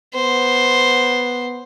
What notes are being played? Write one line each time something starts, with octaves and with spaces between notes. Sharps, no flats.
B3 C5